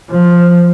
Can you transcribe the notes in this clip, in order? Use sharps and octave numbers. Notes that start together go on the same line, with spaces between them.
F3